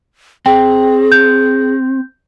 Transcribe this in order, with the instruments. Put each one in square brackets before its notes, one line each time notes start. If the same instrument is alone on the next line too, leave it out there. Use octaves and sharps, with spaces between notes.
[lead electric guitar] C4 [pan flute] G#4 [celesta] G5
[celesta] G6